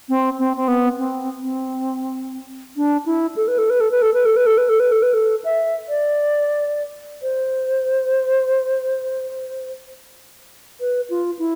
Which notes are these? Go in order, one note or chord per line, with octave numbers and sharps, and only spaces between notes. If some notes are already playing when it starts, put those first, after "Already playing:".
C4
C4
C4
B3
C4
C4
D4
E4
A4
B4
A4
B4
A4
B4
A4
B4
A4
B4
A4
B4
A4
B4
A4
B4
A4
E5
D5
C5
B4
F4
E4